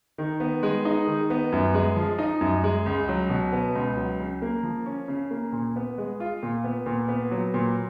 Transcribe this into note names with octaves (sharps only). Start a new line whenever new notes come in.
D#3
B3
G#3
D#4
D#3
B3
F#2
G#3
F3
D#4
F#2
G#3
C#2
F#3
B2
B3
C#2
F#3
C#3
A#3
F3
C#4
C#3
A#3
A#2
B3
G#3
F4
A#2
B3
A#2
B3
F#3
A#2